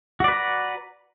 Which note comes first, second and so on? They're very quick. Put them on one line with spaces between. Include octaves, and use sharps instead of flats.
F#4 D5 B4 A#5